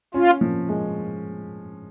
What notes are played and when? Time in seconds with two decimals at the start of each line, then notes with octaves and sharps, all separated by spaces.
0.14 C#4 F4
0.41 F3
0.69 G#3